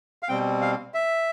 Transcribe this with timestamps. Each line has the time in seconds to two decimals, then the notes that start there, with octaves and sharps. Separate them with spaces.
0.23 F5
0.29 B2 G3 C4 G5
0.61 F5
0.94 E5